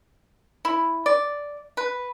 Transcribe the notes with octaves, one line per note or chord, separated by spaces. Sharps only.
E4
D5
B4